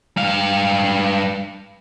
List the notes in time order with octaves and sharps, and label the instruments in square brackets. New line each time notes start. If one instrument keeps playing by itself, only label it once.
[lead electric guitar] G2 F5